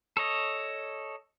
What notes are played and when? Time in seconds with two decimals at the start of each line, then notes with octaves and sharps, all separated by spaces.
0.17 A4 C#5 D#5